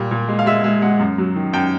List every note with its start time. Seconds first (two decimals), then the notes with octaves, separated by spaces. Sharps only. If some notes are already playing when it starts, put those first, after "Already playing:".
Already playing: A#2 G3
0.11 A#2
0.28 G#3
0.39 F5
0.46 G#3 E5
0.64 G#3 E5
0.82 G#3 F#5
0.99 F#2
1.18 F#3
1.36 D#3
1.53 F#2 G5